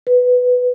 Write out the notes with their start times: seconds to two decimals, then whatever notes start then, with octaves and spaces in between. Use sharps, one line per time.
0.07 B4